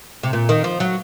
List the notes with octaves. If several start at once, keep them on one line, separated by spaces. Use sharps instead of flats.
C3
A#2
D#3
F3
F#3